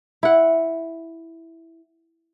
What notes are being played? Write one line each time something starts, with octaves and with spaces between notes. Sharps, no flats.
E4 F#5